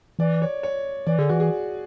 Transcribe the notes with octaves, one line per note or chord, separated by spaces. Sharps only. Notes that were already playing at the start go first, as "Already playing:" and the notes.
E3 D5
C#5
C#5
E3 D5
D3 G#4
E3 F#4
G#4